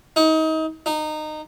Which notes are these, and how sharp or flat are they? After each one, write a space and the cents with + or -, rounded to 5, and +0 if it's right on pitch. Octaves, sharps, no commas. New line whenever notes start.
D#4 +30
D#4 -20